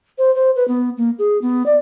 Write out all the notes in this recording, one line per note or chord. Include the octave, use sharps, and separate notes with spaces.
C5
C5
B4
B3
A#3
G#4
B3
D5